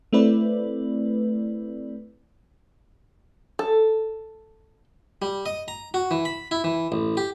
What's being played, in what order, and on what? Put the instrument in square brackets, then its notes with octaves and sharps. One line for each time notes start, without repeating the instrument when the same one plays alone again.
[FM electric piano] A3 C4 E4 B4 D5
[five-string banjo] A4
[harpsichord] G3
D#5
A#5
F#4
E3
B5
E4
E3
A1
G4